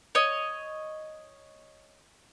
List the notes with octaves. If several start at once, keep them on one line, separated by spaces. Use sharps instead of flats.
C#5 D#5